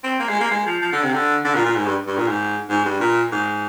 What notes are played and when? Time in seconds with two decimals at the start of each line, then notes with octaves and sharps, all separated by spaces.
0.04 C4
0.20 A#3
0.29 G#3
0.40 A#3
0.51 G#3
0.66 F3
0.82 F3
0.92 D3
1.03 C3
1.13 D3
1.45 D3
1.55 A#2
1.66 A#2
1.76 G#2
1.86 G2
2.07 G2
2.17 A#2
2.28 G#2
2.70 G#2
2.85 G2
3.01 A#2
3.32 G#2